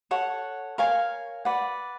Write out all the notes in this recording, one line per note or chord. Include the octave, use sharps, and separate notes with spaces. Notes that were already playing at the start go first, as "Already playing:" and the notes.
A4 C#5 F#5
A#4 C#5 F5 G#5
B4 D5 F#5